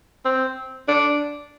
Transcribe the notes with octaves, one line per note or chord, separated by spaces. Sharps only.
C4
D4